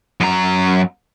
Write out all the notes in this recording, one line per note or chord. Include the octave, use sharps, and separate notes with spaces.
F#2 A#5